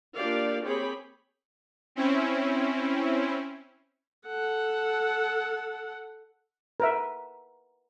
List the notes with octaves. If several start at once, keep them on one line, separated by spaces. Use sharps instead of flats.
A#3 D4 F4 G4 D5 F5
C4 G4 G#4 C#5 B5
C4 C#4 E4
A4 F#5
A#4 B4 E5